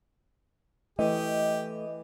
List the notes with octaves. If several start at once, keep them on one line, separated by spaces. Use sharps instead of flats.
E3 A3 G4 D#5